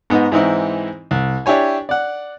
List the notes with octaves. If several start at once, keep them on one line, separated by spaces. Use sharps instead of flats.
G#2 B3 D#4
G#2 E3 C4 D#4 E4
C2
D4 E4 G4 C#5 G#5
D5 F#5